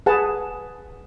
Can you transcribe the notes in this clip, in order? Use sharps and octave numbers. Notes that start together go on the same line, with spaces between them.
G#4 B4 F#5 G#5 A5